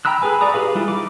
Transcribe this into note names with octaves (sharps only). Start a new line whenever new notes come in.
G5 A#5 B5 E6 F#6
G#4 A4 B4 G#5
F#4 D5 A#5 D#6
G4 G#4 B4 F5
G3 E4 F4
D#4 D6